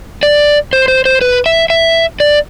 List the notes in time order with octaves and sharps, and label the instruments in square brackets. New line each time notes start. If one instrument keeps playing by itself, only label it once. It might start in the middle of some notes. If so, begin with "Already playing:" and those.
[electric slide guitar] D5
C5
C5
C5
B4
E5
E5
D5